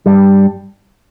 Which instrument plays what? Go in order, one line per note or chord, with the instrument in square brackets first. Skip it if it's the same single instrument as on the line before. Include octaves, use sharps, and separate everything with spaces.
[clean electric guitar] G2 G3